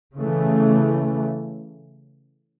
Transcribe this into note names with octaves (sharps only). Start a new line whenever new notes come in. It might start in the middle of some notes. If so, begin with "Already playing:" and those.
C#3 E3 A3